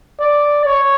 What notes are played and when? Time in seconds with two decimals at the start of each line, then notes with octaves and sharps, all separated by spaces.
0.20 D5
0.65 C#5